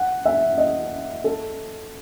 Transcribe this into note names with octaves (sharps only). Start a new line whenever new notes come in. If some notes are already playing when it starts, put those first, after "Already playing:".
Already playing: F#5
E5
D#5
A4